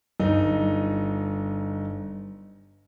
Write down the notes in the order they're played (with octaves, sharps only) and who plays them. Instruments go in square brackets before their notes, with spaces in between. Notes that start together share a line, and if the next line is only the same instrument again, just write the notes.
[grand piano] G1 D#4